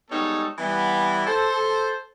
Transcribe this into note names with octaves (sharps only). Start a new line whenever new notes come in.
G3 G#3 B3 D#4 A4 C#5
E3 G3 B3
A4 C5